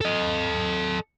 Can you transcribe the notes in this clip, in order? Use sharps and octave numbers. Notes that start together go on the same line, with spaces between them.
A4 D#5